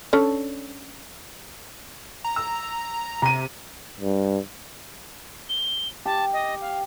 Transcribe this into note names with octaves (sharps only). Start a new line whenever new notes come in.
C#4 D4 A4
A#5
E6
C3 A#5 D#7
G2
G7
G4 A5
D#5
F5